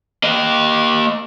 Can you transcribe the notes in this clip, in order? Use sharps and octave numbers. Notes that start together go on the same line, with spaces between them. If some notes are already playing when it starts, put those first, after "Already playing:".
A#3 D#5